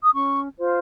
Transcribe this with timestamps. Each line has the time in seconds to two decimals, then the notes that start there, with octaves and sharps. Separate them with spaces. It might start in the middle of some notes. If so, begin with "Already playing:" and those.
0.01 D#6
0.13 C#4 C#6
0.56 F4 C5